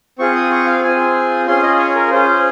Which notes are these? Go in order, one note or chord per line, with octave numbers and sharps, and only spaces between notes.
C4 F4 G#4 C#6
D#6
C#6
F5
C4 F4 G#4 G#5
C#4 F4 G#4 C6
D#5
C#5
A#4
C#4 F4 G#4 C5